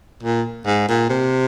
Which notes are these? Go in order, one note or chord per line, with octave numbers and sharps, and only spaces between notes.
A#2
G#2
A#2
C3